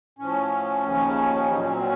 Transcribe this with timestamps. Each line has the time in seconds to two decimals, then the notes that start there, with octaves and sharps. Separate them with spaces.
0.19 A2 F3 C#4
0.84 D#2 C#3 F3
1.50 A#2 F#3 D#4
1.60 C#4
1.70 C4
1.80 C#4